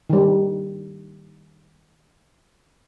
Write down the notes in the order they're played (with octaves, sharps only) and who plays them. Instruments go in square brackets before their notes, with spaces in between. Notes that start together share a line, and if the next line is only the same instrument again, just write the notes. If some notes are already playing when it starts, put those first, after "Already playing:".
[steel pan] D#3 G3